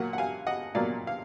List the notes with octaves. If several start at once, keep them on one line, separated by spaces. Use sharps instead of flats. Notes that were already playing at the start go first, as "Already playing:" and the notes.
Already playing: A#2 F#3 A#3 F#5
F#5
F5 G#5
D#5 F#5
A#2 F#3 A#3 D5 F5
F5